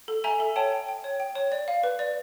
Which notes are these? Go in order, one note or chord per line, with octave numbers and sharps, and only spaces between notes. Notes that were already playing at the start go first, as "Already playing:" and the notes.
A4
E5 G#5 A#5
A4
C#5 G5 A5
G5
G5
C#5
G5
C#5
D5
F5
B4
D5